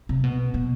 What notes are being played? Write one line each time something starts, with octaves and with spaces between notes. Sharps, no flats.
C3
B2
B2